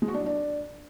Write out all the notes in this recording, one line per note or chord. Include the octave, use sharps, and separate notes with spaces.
G#3
F#4
D4
F#3
D4